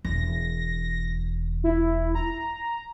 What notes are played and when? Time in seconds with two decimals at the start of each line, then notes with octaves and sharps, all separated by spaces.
0.05 E1 A#6
1.64 E4
2.15 A#5